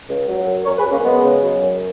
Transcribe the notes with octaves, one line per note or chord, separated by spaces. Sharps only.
C#2
F#3
F#2
F#2 A#4 C#5
G#4 B4
F#2
A#3 C#4
C#3 G#3 B3
C#3
F#3
F#2